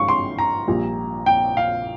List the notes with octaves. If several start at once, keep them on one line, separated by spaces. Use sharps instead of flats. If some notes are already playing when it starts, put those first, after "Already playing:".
Already playing: G#1 G2 F3 G#3 F5 C#6
C6
A#5
A#1 A#2 G3
G5
F5